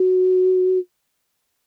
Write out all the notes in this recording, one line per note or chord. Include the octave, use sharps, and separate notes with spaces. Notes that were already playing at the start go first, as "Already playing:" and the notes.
Already playing: F#4